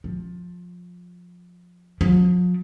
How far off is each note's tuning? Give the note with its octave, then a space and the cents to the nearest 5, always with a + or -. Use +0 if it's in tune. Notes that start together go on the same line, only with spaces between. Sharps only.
F3 +20
F3 +45